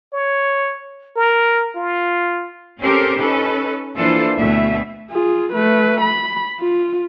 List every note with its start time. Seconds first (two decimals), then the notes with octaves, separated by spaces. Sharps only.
0.13 C#5
1.16 A#4
1.76 F4
2.81 C4 C#4 G4 A4 A#4 C5
3.17 C#4 D#4 A4 B4
3.97 E3 A#3 D4 F4 A4 C5
4.36 D2 B2 A3 E5
5.11 F4 G#4
5.53 A3 B4
6.01 B5
6.60 F4